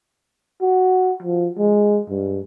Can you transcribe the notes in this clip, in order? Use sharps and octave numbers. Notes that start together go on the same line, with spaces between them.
F#4
F3
G#3
G2